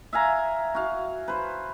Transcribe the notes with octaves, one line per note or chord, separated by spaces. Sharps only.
E5 F5 G#5 A#5
F#4 F5
B4 C5